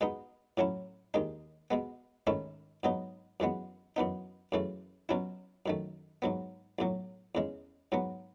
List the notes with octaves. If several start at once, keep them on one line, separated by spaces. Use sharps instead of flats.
B2 G#3 B3 D#4
A2 F#3 C#4 E4
D#2 D#3 G#3 D#4
B2 G#3 B3
G#2 D#3 A3 C#4 E4
G#2 F#3 B3 D#4
F#2 E3 G#3 B3
F#2 E3 B3 D#4
F#2 C#3 E3 A3
B2 F#3 C#4 E4
F#2 D#3 A3
G#2 F#3 B3
B1 A2 F#3
E2 C#3 G#3
G#2 F#3 B3